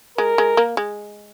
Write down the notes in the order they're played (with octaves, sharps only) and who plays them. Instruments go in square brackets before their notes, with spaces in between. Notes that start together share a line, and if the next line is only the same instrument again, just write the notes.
[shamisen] G#3 [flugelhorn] A#4
[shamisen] G#3
A#3
G#3